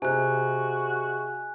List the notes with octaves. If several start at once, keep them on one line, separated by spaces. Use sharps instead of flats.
C3 F#4 G#4 D#5 E5 G#5 F#6